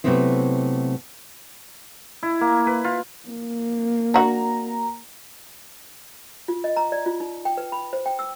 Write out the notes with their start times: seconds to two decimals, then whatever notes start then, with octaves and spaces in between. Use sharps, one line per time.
0.04 C3 F#3 A3 B3 C4 E4
2.23 E4
2.41 A#3
2.67 B4
2.84 F4
3.28 A#3
4.14 D4 F#4 A#5
6.48 F4
6.64 D#5
6.77 A#5
6.92 D5
7.06 F4
7.20 D#4
7.45 G5
7.57 B4
7.72 B5
7.93 C5
8.06 G5
8.19 E6